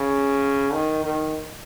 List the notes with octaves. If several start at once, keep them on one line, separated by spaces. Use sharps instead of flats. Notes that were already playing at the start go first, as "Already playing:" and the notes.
Already playing: C#3
D#3
D#3